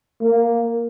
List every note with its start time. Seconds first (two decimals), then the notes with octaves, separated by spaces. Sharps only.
0.21 A#3